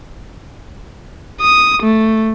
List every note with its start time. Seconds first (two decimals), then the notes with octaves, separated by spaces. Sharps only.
1.41 D#6
1.83 A3